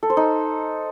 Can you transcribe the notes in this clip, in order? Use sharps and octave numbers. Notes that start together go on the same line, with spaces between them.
A4
C5
D#4